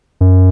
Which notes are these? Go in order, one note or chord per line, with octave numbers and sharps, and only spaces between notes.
F#2